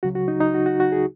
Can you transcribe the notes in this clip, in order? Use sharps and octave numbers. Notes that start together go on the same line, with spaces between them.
C#2 C#3 F#3 F#4
F#4
D#4
D#4
F#4
F#4
F#4
G#4